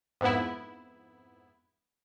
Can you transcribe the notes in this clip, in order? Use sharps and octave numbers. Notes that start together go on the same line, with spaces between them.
F2 G#2 B3 E4